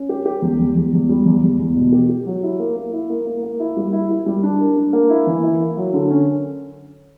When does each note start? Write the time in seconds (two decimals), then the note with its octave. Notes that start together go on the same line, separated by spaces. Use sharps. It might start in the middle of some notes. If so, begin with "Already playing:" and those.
Already playing: C#4
0.09 G4
0.25 G4
0.42 E2
0.59 E2
0.75 E2
0.93 E2
1.09 G3
1.26 E2
1.42 E2
1.59 E2
1.76 B2
1.92 G4
2.09 G4
2.26 F#3
2.43 E4
2.59 A#3
2.76 A#3
2.93 E4
3.10 A#3
3.27 A#3
3.43 A#3
3.60 E4
3.77 G3
3.93 E4
4.10 E4
4.26 G3
4.43 D4
4.60 A#4
4.77 D4
4.93 A#3
5.10 E4
5.27 E3
5.43 E4
5.60 A#3
5.77 F#3
5.93 D3
6.10 C#4